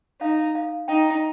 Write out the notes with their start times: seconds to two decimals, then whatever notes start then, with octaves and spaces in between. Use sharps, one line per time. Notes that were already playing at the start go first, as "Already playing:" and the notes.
0.21 D#4 F5
0.55 F5
0.88 D#4 G5